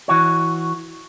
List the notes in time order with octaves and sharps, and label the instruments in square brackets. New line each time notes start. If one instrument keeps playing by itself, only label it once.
[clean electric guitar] E3 F#4 C#5